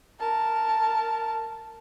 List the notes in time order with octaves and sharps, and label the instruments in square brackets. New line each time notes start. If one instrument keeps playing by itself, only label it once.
[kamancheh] A#4 A5